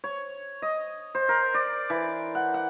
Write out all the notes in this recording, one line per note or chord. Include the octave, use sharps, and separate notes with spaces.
C#5
D#5
C5
A#4
D5
E3
F#5
F#5